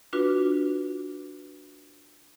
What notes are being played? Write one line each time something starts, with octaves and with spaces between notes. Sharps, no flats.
D4 F4 F#4 B4